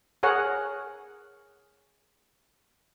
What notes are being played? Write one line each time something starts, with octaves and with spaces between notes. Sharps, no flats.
G#4 A#4 C#5 F#5